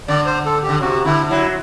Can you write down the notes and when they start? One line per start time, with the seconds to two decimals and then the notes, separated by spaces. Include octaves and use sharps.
0.08 D3 D5
0.26 C5
0.45 A4
0.63 G4
0.69 D3
0.81 C3 F#4
1.05 D3 E4
1.30 F#3 E4